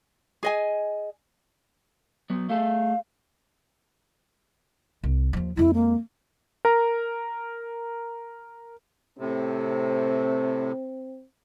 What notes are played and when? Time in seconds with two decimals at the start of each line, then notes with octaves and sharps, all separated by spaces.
0.43 G#4 D#5 G#5
2.30 F#3 B3
2.49 A3 G#4 A4 F5
5.04 C2
5.33 D#2 F3
5.57 F2 G#3 E4
5.74 A#3
6.65 A#4 A#5
9.19 A2 C3 C4